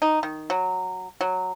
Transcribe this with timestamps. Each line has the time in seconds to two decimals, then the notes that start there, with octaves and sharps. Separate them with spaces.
0.02 D#4
0.23 D#3
0.50 F#3
1.21 F#3